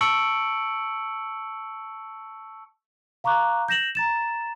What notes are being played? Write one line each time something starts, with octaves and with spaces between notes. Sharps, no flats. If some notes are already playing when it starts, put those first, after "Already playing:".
A5 C#6 E6 C#7 D7 F#7
F5 A#5 C#6 D6 F#6
G6 A#6 E7 F#7
A#5 A6 E7